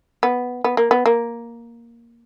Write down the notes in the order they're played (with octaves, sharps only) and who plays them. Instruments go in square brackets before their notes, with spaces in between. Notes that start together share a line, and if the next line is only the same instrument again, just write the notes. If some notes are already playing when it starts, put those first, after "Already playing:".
[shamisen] B3
B3
A#3
B3
A#3